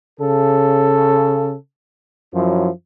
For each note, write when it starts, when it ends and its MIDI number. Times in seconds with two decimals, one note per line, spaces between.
0.20 1.54 49
0.20 1.54 69
2.34 2.70 42
2.34 2.70 53
2.34 2.70 54
2.34 2.70 64